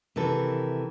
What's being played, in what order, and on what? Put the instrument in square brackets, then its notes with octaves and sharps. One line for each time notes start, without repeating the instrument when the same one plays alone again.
[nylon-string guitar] C3 D#3 E3 A4